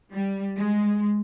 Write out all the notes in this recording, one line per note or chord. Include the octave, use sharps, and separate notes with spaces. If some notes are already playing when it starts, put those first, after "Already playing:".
G3
G#3